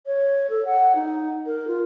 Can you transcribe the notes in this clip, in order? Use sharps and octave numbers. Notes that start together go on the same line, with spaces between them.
C#5
A4
F#5
D#4
A#4
F4